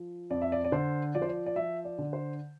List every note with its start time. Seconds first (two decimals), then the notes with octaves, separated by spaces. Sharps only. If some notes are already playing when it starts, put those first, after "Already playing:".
Already playing: F3
0.30 F2 D5
0.42 E5
0.52 D5
0.65 D5
0.72 D3 C5
1.15 F3 D5
1.22 C5
1.29 D5
1.46 D5
1.56 F3 E5
1.85 D5
1.98 D3
2.13 C5